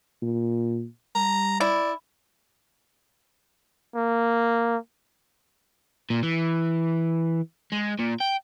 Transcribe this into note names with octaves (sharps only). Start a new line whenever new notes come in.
A#2
G3 A#5
E4 D5
A#3
A#2
E3
G#3
A#2
G5